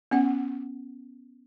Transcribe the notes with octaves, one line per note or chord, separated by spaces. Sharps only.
B3 C#4 F#5